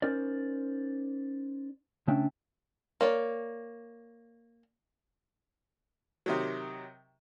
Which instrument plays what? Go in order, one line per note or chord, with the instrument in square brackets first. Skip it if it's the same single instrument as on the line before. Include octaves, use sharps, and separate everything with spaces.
[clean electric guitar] C#4 D#4 A#4 C5 D5
C#3 A3 C#4 D4 E5 G5
[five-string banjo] A#3 C#5 D5
[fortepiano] C3 D#3 F#3